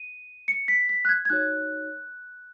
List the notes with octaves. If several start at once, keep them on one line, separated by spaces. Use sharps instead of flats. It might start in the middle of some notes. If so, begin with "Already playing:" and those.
Already playing: D#7
C#7
B6
B6
F#6
G#6
G#6
D#4 F#4 C#5 F#6